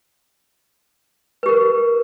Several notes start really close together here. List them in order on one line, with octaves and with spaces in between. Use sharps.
B4 G4 A#4